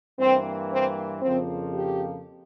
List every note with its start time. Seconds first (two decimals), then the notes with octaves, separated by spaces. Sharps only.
0.19 G2 E3 A#3 C4
0.71 C4
1.22 F2 C#3 F3 A#3 C4
1.73 G4